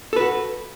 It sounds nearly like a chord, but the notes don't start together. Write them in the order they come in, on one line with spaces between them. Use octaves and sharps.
A4 B4 F#4